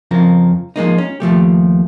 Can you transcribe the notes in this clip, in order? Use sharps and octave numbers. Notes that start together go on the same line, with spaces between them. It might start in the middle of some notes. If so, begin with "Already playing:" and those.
F2 C#3 F3 A#4
F3 G#3 A#3 D#4
C#4
D#2 F3 A3 G4